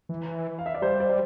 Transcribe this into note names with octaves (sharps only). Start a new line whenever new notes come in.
E3
F5
E5
D5
G3 C5
D5
C5